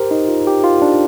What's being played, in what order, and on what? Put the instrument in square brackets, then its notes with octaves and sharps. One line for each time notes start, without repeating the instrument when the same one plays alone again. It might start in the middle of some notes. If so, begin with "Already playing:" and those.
Already playing: [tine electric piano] G4 A#4 C5
D#4
F4
G4
F4
D4